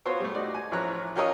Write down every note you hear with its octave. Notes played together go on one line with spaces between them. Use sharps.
B3 F4 F#4 C5 C#5
G3 A3
D#4 F#4 D5
G#5
A1 F3 E4 C#5 A#5 F#6
C#4 F4 G4 A#4 C#5 D#5